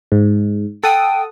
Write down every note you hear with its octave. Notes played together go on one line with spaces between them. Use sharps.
G#2
A4 F#5 G5 D#6